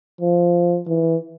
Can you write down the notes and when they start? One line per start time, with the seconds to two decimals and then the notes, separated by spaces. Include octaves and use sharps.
0.21 F3
0.87 E3